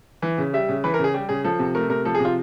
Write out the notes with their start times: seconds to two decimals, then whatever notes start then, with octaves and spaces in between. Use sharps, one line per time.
0.22 E3
0.38 C#3
0.53 G3 E5
0.69 C#3
0.84 E3 B4
0.94 A#4
0.99 C#3
1.04 G#4
1.14 G3 G4
1.29 C#3 G#4
1.44 F3 A4
1.59 C3
1.75 A3 A#4
1.89 C3 A#4
2.05 F3 A4
2.15 G#4
2.20 C3
2.25 F4